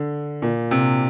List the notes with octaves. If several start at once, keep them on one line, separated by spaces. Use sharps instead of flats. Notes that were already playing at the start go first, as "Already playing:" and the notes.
Already playing: D3
A#2
C3